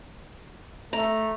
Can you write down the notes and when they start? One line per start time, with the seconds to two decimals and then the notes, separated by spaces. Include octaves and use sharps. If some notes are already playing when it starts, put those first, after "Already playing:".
0.93 A3 A#5